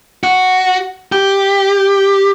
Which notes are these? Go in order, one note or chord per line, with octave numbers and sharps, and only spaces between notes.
F#4
G4